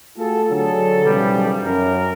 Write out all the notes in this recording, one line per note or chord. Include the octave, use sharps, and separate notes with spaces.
A3 F4 F#4 G#4 A4
D3 F#3 D4 G#4 A4
B1 E2 C#3 F3 G3
F#2 C#4 A#4